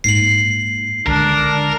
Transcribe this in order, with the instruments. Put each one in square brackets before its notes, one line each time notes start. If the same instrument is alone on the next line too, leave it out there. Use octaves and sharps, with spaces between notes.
[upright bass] G#2 A#3 [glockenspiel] C7 F#7
[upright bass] C#2 D3 [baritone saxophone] D4 [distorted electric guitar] A#4